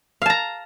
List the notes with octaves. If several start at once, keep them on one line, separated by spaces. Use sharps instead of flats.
F5 A5 A#5